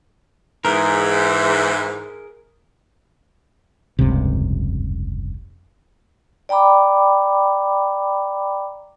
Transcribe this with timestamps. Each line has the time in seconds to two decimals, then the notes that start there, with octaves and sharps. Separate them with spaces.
0.65 G#2 E3 G#4 A#4
3.99 F1 C#2 G2 C3
6.49 D5 G5 A#5 B5 D6